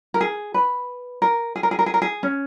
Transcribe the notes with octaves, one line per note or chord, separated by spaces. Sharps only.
A#4
G#4
B4
A#4
G#4
A#4
G#4
A#4
G#4
A#4
G#4
C#4